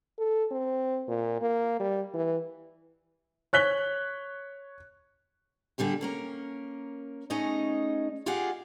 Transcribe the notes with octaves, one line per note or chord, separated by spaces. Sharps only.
A4
C4
A#2
A#3
G3
E3
C#5 F#6 B6 G7
B2 D3 G3 G4 G#4
A#3 C#4 A#4
A3 C#4 D#4 G#4 D#5
F4 G4 G#4 D#5 F5 F#5